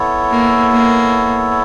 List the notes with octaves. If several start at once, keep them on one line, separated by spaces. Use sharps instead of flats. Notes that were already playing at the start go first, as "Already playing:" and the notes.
Already playing: B3 E4 A4 C#5
A#3
A#3